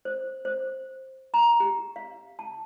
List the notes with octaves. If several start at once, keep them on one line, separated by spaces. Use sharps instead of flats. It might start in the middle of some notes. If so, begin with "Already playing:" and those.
C5
C5
A#5
G4
F5
A5